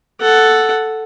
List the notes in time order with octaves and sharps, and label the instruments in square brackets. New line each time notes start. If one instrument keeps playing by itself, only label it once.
[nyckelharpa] A4 F#5